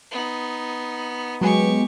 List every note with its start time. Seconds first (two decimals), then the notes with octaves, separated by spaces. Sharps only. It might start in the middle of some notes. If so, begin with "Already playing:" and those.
0.11 B3 D#4
1.41 F#3 G#3 B3 G4 G#4 C#6